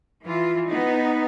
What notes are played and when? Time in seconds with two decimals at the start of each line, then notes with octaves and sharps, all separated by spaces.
0.25 E3 F4
0.68 B3 D#4